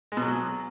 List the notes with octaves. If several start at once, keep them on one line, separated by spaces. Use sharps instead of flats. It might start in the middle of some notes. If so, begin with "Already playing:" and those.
G#3
B2
F#3